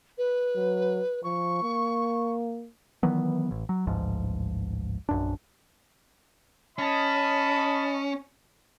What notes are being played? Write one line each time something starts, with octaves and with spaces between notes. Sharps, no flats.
B4
F#3
F3 C#6
A#3
D#3 E3 F#3 B3
A1
F#3
A1 D2 G#2 F3
A#1 F#2 D4
C#4 D#5 A5 B5